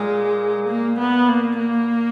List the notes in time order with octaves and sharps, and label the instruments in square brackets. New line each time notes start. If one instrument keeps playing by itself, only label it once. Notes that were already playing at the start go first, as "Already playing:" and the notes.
Already playing: [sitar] A#2 [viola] G#3
[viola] A#3
B3
A#3
A#3